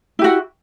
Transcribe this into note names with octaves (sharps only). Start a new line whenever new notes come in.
E4 F#4 G4